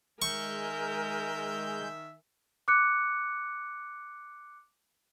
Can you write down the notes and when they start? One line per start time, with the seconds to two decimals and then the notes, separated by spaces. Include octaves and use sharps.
0.22 D#3 G#3 A#4 E5 G#5 C#6 G6
2.68 D6 F#6 C#7